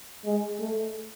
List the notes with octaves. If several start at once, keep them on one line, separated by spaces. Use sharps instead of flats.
G#3
A3